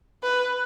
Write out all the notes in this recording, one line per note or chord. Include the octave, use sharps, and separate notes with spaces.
B4